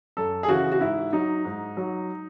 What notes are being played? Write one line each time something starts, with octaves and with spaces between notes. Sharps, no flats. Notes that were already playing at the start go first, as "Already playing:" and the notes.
F#2 A4
G#4
C#3 E3 F#4
F#4
G#2 E4
F#3 D#4
G#2
F#3